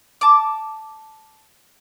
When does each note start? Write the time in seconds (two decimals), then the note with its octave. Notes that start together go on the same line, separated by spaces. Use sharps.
0.21 A5 D6